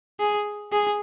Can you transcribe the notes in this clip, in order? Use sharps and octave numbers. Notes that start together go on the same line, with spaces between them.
G#4
G#4